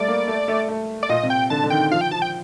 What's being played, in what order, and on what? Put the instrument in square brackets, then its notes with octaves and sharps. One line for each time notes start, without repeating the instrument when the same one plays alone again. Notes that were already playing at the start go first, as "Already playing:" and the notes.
Already playing: [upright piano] G3 A3 [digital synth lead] D5
[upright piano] A#3
A3
A3
A3
[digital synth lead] D5
[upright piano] A#2 [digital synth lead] D#5
[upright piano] C3
[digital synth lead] G5
[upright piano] D3 [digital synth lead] A5
[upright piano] D3
[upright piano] D#3 [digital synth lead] G5
[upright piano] F3 [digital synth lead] F5
[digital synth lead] G5
[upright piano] F3 [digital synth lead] A5
[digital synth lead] G5